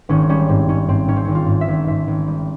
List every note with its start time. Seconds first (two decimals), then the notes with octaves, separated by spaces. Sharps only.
0.09 G#1 C#4
0.29 G3 C#4
0.49 G#2 C4
0.69 G#2 C#4
0.89 G#2 C4
1.08 G#2 C#4
1.16 C4
1.25 G#1 C#4
1.35 F4
1.48 G#2
1.61 E5
1.68 G#1
1.87 G#2 E5
2.08 G#1
2.27 G3